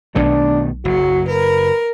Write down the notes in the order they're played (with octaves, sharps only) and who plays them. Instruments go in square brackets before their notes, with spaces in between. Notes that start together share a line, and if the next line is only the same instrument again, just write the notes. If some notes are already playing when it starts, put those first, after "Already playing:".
[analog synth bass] B1 [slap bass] B2 D#3 A3 [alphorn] D4
[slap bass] F#1 [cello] F#3 [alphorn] F#4
[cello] A#4 [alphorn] B4